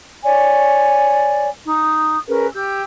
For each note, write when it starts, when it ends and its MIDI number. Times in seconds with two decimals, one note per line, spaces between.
0.22 1.47 73
0.22 1.47 74
0.22 1.47 80
1.66 2.17 63
1.66 2.17 87
2.27 2.46 61
2.27 2.46 68
2.27 2.46 70
2.27 2.46 71
2.53 2.82 67
2.53 2.82 88
2.53 2.82 91